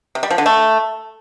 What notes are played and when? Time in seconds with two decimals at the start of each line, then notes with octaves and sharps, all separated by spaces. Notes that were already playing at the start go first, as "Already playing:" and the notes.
0.15 C3
0.23 G3
0.30 F3
0.38 D3
0.46 A3